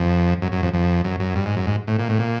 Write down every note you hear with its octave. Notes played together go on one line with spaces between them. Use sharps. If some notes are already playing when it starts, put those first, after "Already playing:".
Already playing: F2
F#2
F#2
F2
F2
F#2
F#2
G2
G#2
F#2
G#2
A2
A#2
A2
A#2